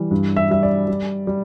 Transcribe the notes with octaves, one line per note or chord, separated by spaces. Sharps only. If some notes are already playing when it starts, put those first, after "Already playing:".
Already playing: E3 G3
G2
E5
G3 E5
D5
G3
G3